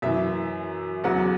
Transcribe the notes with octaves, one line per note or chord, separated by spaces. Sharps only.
F#2 E3 E5
E2 C#3 F#3 F#5